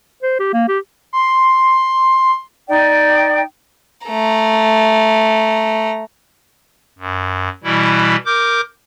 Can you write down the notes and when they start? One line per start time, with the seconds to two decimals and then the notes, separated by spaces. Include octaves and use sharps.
0.23 C5
0.40 G4
0.53 A#3
0.68 G4
1.13 C6
2.67 D#4 D5 G5
4.07 A3 A#5
6.99 F#2
7.64 B2 E3 G3 E4
8.26 A#4 D6 G6